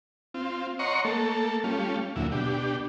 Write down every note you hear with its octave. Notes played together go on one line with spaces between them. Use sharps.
C4 F4
C#5 D#5 F#5 A#5 C6 C#6
A3 A#3 A4
G3 A3 C#4 F4
D2 A#2 F#3 E4
B2 D4 G4